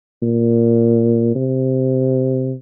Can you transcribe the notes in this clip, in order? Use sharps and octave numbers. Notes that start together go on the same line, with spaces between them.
A#2
C3